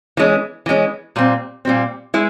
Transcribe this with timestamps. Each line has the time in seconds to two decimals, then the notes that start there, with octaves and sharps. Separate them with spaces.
0.17 E3 G#3 C#4
0.66 E3 G#3 C#4
1.16 A#2 G3 C4
1.65 A#2 G3 C4
2.14 G#3 E4 B4